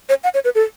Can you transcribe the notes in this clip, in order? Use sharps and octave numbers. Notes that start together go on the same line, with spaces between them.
C#5
F#5
C#5
B4
A4